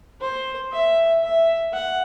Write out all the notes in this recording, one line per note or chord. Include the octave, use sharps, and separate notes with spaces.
C5
E5
E5
F#5